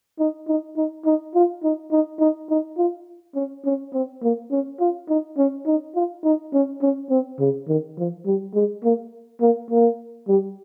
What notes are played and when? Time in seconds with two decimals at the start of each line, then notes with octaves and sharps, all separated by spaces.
0.19 D#4
0.48 D#4
0.77 D#4
1.05 D#4
1.35 F4
1.63 D#4
1.92 D#4
2.20 D#4
2.50 D#4
2.78 F4
3.35 C#4
3.65 C#4
3.93 C4
4.22 A#3
4.51 C#4
4.80 F4
5.09 D#4
5.37 C#4
5.66 D#4
5.95 F4
6.24 D#4
6.54 C#4
6.82 C#4
7.10 C4
7.40 C#3
7.68 D#3
7.98 F3
8.26 G3
8.54 G#3
8.83 A#3
9.41 A#3
9.70 A#3
10.28 G3